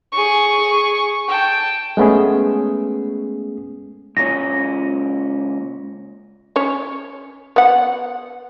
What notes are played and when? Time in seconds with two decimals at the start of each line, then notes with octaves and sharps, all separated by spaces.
0.12 G#4 C#6
1.28 G5 A5
1.97 G#3 A3 B3 C#4 G#4
4.17 C#2 A#2 C#4 A#6
6.56 C#4 C#5
7.56 B3 F#5